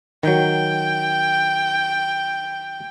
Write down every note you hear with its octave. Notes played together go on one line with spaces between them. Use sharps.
D#3 F#3 G5